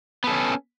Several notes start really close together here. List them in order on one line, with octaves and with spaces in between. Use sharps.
B3 A4 C#4